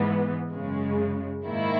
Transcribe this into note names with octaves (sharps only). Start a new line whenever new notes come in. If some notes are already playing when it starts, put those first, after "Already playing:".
Already playing: G#2 E3 B3
F#2 C#3 G#3
G#2 D#3 A#3 E4